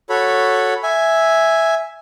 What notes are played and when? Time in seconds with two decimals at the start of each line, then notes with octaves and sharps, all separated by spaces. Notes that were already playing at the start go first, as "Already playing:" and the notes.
0.09 F#4 A4 C#5 B5
0.83 E5 G#5